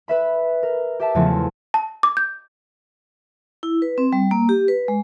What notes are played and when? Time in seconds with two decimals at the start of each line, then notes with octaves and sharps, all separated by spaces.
0.08 B4 E5 B5
0.63 A#4
1.00 G4 E5 A5
1.15 E2 C#3 F3 F#3 A3 C4
1.74 A5
2.03 D6
2.17 G6
3.63 E4
3.82 B4
3.98 C4
4.13 G3
4.31 A#3
4.49 G4
4.68 B4
4.88 G#3